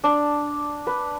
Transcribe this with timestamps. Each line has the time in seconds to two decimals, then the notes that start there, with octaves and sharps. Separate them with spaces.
0.04 D4
0.87 B4